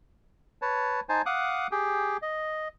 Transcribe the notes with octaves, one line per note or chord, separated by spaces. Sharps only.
B4 C#5 A5
D#4 C5 G#5 A5
F5 F#5 D6 D#6 F#6
G4 G#4 G5
D#5